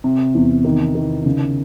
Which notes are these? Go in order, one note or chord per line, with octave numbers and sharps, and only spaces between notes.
C3
E2
D#3
D#3
C#3